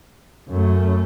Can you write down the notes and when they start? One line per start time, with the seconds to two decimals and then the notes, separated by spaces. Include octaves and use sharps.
0.49 F#2 A3